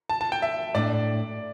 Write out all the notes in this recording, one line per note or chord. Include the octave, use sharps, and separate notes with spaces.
A5
A5
G5
E5
A2 A3 D4 D5